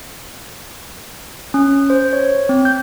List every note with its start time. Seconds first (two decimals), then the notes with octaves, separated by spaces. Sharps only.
1.54 C#4
1.90 C5
2.13 C#5
2.49 C4
2.65 G6